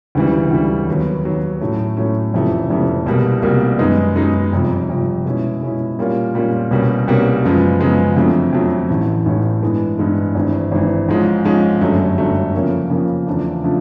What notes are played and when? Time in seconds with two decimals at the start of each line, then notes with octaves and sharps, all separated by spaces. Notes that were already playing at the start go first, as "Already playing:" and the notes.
0.15 D2 C#3 E3 G3
0.51 D2 C#3 E3 G3
0.87 D#2 D#3 F#3 B3
1.24 D#2 D#3 F#3 B3
1.61 A2 F#3 A3 C#4
1.97 A2 F#3 A3 C#4
2.33 F1 F2 C#3 E3 A3
2.70 F1 F2 C#3 E3 A3
3.06 C2 B2 G3 A#3
3.42 C2 B2 G3 A#3
3.79 F#2 D#3 G#3 B3 D#4
4.16 F#2 D#3 G#3 B3 D#4
4.52 G1 F2 C3
4.88 G1 F2 C3
5.25 B2 G#3 C#4 E4
5.62 B2 G#3 C#4 E4
5.98 A#2 G3 A#3 C#4 F4
6.34 A#2 G3 A#3 C#4 F4
6.71 C2 B2 G3 A#3 C#4
7.07 C2 B2 G3 A#3 C#4
7.44 F#2 C#3 F3 G#3 B3
7.81 F#2 C#3 F3 G#3 B3
8.17 F2 D3 F#3 A3 C4
8.53 F2 D3 F#3 A3 C4
8.89 A1 A2 E3 A3 C#4
9.25 A1 A2 E3 A3 C#4
9.62 G2 E3 G#3 B3
9.99 G2 E3 G#3 B3
10.35 G#1 G2 E3
10.72 G#1 G2 E3
11.08 G#2 F3 G#3 C#4
11.45 G#2 F3 G#3 C#4
11.81 G1 F#2 D3 F#3 A3
12.18 G1 F#2 D3 F#3 A3
12.54 F2 C#3 F3 A#3 C#4
12.90 F2 C#3 F3 A#3 C#4
13.27 E2 C#3 F3 A3 D4
13.64 C#3 F3 A3 D4